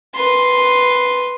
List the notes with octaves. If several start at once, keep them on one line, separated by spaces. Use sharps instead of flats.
B4 C6